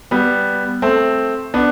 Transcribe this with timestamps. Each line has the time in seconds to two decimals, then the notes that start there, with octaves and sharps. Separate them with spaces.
0.11 G3 B3
0.82 A3 C4
1.54 B3 D4